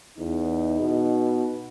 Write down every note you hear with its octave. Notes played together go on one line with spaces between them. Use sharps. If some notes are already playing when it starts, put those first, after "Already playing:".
E2 D#4
B2